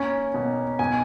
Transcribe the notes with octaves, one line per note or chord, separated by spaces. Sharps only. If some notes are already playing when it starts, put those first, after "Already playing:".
Already playing: A#3 C#4
B2
B2 G#5